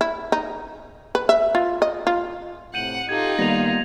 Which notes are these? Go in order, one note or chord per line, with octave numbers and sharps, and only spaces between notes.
E4
D#4
B4
E5
F4
D#5
F4
A2 C3 F#5 G6 D#7 F#7
D#4 F4 G4 A4 G#6
D#3 G3 A#3 B3 A#6 F7